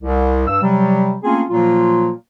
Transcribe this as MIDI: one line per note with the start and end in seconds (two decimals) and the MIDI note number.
0.03 0.46 36
0.47 0.61 43
0.47 0.61 88
0.62 1.16 48
0.62 1.16 54
0.62 1.16 55
1.23 1.43 57
1.23 1.43 58
1.23 1.43 60
1.23 1.43 61
1.23 1.43 65
1.23 1.43 68
1.50 2.10 46
1.50 2.10 53
1.50 2.10 54
1.50 2.10 58
1.50 2.10 65